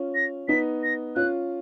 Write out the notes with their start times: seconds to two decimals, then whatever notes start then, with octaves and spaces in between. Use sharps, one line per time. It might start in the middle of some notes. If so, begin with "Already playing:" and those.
Already playing: C#4 F4
0.15 A#6
0.48 B3 D#4 B6
0.83 A#6
1.16 C#4 F4 F#6